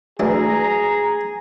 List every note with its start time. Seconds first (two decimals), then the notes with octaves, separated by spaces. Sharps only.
0.20 D2 E3 D4 G#4 A#5